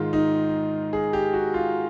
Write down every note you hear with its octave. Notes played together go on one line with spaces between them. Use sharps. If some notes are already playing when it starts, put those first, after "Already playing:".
Already playing: G#2 D#3 G#3 F4
D#4
G#4
G4
F#4
F4